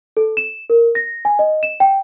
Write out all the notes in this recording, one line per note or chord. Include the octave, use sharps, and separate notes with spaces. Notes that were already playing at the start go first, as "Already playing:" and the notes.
A4
E7
A#4
A#6
G#5
D#5
E7
G5